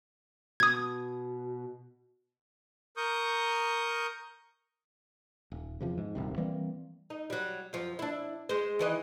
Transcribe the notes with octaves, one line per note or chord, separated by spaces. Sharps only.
B2 D#6 G#6
A#4 C#6 D#6 G6
D#1
E2 C3 F3
G#2
D#1 C2 C3
E3 G3 A#3 C4
D#4
F#3 G3
F#2 F3
D4 E4
G#3 C5
D#3 E3 D#5